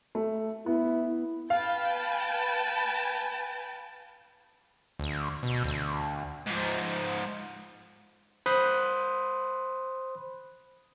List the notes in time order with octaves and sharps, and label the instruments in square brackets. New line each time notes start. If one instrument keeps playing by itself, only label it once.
[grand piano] A3
[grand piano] B3 [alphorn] E4
[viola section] B4 G5 A5 [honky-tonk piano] F5
[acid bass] D2
B2
D2
[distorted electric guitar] G#2 F3
[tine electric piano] C5 B5 C6 D#6 F#6